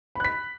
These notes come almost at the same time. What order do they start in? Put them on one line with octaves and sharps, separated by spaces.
B5 F#6 B6